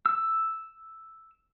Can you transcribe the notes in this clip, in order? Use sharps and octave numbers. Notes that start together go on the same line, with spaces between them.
E6